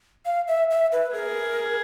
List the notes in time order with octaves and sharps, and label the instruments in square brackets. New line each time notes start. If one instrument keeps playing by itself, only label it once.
[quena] F5
E5
E5
B4
[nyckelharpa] G#4 [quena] A#4